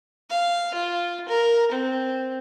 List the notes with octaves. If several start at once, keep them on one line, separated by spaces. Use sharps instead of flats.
F5
F4
A#4
C4